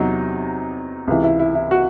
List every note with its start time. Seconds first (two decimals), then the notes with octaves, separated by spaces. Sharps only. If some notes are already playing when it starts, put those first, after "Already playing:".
Already playing: E2 C3 F#3 D#4
1.07 C#2 C3 E3
1.24 E4
1.39 E4
1.55 E4
1.71 F#4